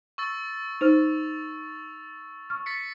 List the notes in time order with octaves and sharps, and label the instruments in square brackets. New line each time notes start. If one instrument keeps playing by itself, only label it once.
[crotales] C#6 E6 A6
[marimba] D#4 C5 F6 [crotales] F7
[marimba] C#6 F6
[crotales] A6 B6 C#7